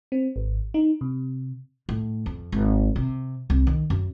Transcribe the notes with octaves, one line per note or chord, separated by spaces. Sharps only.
C4
G#1
D#4
C3
A2
F2
G#1
C3
C2
D#3
F#2